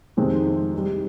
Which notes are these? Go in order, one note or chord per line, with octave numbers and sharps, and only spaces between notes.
F2 C3 D#3 G#3 C4
G3 C4 D#4